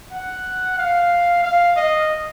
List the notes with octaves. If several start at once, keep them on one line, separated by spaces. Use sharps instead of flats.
F#5
F5
F5
D#5